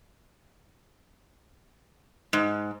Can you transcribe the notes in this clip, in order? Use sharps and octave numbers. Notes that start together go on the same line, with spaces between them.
G#2